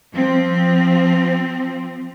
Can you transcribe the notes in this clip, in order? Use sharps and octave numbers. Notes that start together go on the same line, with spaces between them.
F3 C4